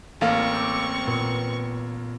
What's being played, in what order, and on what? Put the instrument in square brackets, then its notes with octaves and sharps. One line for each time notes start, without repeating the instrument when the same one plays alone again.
[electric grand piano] A1 A#3 [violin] C4 C#6 [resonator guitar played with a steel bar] A4 F5
[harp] D6 E6 G6
A#2 B3